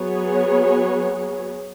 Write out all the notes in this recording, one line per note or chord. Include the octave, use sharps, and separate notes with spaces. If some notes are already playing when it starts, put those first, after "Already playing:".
Already playing: F#3 B3 G#4 C#5